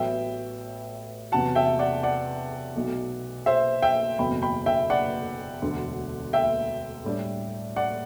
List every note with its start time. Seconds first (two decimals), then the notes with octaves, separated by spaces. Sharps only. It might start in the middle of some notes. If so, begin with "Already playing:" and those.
Already playing: A1 A2 F#3 B3 E5 G5
1.32 E2 C3 F#3 F#5 A5
1.55 E5 G5
1.79 D5 F#5
2.03 D5 F#5
2.75 B1 B2 A3
3.46 C5 E5
3.82 E5 G5
4.18 F#1 E2 B2 A3 C4 G5 B5
4.42 G5 B5
4.66 E5 G5
4.90 D5 F#5
5.62 E1 D2 D3
6.33 E5 G5
7.04 A2 G3 D4
7.76 D5 F#5